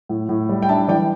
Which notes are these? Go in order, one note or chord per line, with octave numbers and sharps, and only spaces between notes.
A2
A2
G3
G5
D4 E5 A5
E3 D5 G5